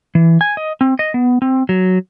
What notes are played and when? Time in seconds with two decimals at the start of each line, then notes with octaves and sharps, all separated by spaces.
0.15 E3
0.41 G#5
0.57 D#5
0.81 C4
0.99 D#5
1.14 B3
1.42 C4
1.69 F#3